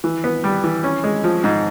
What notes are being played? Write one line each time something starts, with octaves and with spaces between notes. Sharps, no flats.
E3
B3
G3
E3
C#4
G#3
F3
G#2